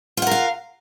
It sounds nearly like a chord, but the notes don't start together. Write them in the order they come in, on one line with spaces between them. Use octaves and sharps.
F4 F#5 A#4 F5